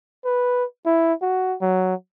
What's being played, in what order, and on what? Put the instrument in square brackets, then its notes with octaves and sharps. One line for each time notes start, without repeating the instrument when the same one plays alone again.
[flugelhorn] B4
E4
F#4
F#3